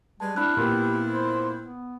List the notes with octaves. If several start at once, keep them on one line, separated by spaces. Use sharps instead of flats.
G3 G#3 B4 A5
C4 D4 E4 B5 F6 F#6
A#2 B3 G4
C5
B3